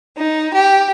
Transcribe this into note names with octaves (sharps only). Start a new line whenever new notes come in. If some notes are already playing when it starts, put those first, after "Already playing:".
D#4
G4